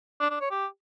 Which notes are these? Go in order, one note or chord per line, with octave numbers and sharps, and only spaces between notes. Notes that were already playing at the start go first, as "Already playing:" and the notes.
D4
D4
C#5
G4